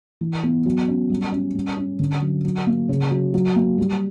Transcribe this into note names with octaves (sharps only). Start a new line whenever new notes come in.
E3
B3
F#3
C#4
G3
C#4
G3
C#4
D3
F#3
F#3
A#3
C#3
F#3
F#3
A#3
G3